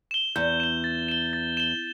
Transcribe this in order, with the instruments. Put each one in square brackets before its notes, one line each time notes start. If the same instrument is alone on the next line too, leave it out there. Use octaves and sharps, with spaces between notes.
[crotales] E7 G7
[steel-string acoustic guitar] E2 [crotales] G6
[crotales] E7 G7
A6
E7 G7
A6
E7 G7